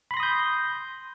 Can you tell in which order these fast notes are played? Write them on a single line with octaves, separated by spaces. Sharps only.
B5 C6 A#6 D#6 G6